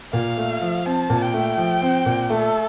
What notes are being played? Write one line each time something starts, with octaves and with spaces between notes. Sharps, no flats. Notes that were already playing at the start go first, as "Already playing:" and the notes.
A#2 F5
A3
F3
C4 A5
A#2
G5
A3
F3
C4
A#2
A3 A4